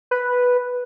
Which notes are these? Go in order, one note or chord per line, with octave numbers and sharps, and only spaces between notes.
B4